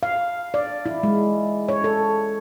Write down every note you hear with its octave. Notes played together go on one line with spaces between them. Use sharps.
F5
D5
E4
G#3
C#5
A4